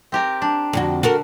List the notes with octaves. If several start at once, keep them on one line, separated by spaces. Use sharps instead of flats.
C4 G4 A#4
D4
F2 D3 F#4
D3 F#4 A4 A#4